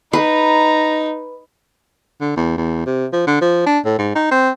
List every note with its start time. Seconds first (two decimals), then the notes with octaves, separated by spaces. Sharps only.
0.13 D#4 B4 A#5
2.21 D3
2.36 E2
2.57 E2
2.86 C3
3.13 F3
3.27 D3
3.41 F3
3.66 D4
3.85 A2
3.98 G#2
4.15 D#4
4.31 C4